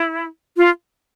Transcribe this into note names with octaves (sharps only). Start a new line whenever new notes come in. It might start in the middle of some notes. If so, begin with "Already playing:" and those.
Already playing: E4
F4